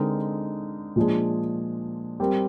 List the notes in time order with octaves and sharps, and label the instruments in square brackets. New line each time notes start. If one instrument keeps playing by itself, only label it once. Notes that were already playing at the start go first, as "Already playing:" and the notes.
Already playing: [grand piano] D3 G#3 C4 D#4 A#4
A#2 F3 G#3 D4 G#4
G3 C4 G4 A#4